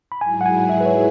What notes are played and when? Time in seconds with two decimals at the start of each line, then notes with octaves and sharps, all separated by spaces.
0.12 B5
0.21 G#2 F#3 E4 G#4 G#5
0.41 F#5
0.46 G#5
0.69 E5
0.81 B4
0.86 C#5